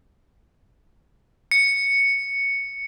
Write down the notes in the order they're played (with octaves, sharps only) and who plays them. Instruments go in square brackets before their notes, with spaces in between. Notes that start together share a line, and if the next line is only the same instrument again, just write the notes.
[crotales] C#7